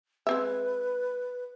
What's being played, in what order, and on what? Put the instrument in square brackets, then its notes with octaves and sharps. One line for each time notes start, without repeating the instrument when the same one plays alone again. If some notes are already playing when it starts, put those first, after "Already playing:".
[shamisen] G#3 C4 E5 [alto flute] B4